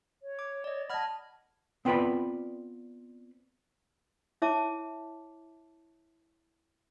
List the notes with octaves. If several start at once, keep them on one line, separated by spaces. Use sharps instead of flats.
C#5
D6
D5 D#5
D#5 F#5 A5 B5 F6 G#6
B3 C4 F4 B4 D5 B5
E4 C#5 E5 A5 D6